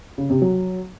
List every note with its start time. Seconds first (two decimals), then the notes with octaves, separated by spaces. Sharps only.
0.18 C#3
0.30 C3
0.42 F#3